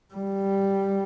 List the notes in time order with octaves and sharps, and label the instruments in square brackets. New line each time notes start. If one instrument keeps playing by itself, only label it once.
[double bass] G3